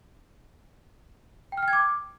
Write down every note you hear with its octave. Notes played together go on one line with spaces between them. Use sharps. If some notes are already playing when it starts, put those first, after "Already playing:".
G5
F6
G5
G#6
D6